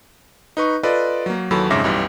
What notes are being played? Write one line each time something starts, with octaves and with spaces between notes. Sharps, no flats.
D#4 B4 C#6
F4 A4 B4 D5 D#5
F#3 A#3
D#2 E3 F#3 A4 B5
F2 G#2 C#3 E5 D6 A#6
B1 F#2 E3 G3